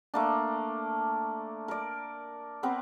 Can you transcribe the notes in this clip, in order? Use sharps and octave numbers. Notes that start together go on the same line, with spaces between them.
A3 A#3 D4
A#4 D5
B3 C4 A#4 B4